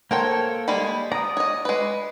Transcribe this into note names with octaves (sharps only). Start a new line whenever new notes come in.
A#3 A4 A#4 C5 C#5 G5
G3 G#3 B5
D5 A#5 D#6
C#5 D#5
G#3 B4